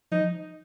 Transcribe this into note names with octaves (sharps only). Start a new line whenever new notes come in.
F3 D#4